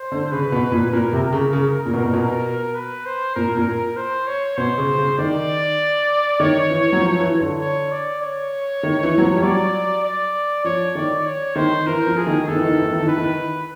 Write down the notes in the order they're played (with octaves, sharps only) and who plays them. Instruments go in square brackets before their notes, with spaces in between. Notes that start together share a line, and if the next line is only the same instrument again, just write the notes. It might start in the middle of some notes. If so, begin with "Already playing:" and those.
Already playing: [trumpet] C5
[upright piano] D3
[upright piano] C#3 [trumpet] B4
[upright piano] B2
A#2
[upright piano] A#2 [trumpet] A#4
[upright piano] C3
C#3
C#3
A#2
B2
A#2
[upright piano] B2 [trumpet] A#4
[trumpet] B4
C5
[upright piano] A#2 [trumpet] A#4
[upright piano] A#2
[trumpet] A#4
C5
C#5
[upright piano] B2 [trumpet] C5
[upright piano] C#3
C#3
[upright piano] D#3 [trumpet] D5
[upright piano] D#3 [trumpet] C#5
[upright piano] E3
F#3
F3
E3
D3
[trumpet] C#5
D5
C#5
[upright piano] D#3
E3
F#3
F3
G3
[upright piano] F#3 [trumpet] D5
[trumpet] D5
[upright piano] F3 [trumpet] C#5
[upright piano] D#3 [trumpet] D5
[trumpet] C#5
[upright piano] D#3 [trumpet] C5
[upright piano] E3 [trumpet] A#4
[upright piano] F3
[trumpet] G#4
[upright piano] D#3
[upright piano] D#3 [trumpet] A4
[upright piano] E3
D#3
E3
D#3
E3
D#3
[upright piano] E3 [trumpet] B4
[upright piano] D#3